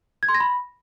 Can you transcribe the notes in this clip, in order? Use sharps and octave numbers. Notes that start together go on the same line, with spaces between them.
G#6
C6
A#6
B5